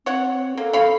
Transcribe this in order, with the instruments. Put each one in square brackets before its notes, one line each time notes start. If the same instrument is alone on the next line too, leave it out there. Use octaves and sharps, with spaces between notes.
[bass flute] C4 [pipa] C#5 F#5
[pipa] A#3 [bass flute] A4
[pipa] C#5 F5 B5